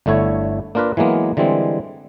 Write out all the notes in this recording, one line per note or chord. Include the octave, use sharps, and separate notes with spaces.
G1 D3 A3 E4 C#5
A#3 D4 F4 A#4 B4
E3 F#3 G#3 A#3 B3
D3 E3 G3 G#3 C4